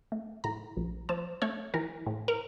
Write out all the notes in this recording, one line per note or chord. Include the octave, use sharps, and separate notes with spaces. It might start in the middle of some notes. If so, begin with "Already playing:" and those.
A3
A2 A#5
A#1
F3 A5
A3 C#5
E3 A#4
A2
A#4